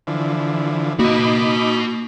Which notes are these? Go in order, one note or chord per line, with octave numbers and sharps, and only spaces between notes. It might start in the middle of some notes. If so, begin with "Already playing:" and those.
D3 E3 F3
A#3 D#4 F#4 D#5 B5 D6